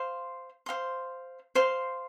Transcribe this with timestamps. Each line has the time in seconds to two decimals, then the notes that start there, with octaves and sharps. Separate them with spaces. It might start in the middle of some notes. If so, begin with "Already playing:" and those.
Already playing: C5 F5 C6
0.66 C5 F5 C6
1.55 C5 F5 C6